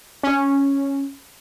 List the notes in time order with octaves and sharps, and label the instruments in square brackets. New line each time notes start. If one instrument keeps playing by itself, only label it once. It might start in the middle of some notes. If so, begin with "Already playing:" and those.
[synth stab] C#4